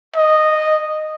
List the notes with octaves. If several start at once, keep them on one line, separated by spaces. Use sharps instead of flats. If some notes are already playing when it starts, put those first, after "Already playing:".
D#5